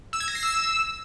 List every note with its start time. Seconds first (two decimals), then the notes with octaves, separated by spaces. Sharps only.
0.13 E6
0.20 G#6
0.28 A#6
0.35 C7
0.43 E6